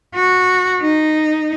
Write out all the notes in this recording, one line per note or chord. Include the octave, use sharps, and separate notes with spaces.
F#4
D#4